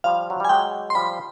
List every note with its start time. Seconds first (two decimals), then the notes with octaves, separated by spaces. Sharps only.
0.04 F3 G3 F5
0.30 F#3
0.40 G3 G#5
0.49 F#3 G#3 G5
0.90 C6
0.95 F3 G3 B5